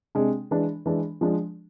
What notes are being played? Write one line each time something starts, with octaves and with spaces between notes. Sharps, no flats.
C3 G#3 D4
E3 G#3 D4
E3 G#3 D4
F3 G#3 D4